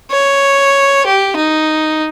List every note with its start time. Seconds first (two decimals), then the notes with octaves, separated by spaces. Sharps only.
0.11 C#5
1.06 G4
1.36 D#4